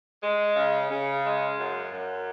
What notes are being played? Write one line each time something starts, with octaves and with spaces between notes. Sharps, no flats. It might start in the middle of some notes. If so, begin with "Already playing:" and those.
G#3
C#3
C#3
G#3
F#2
F#2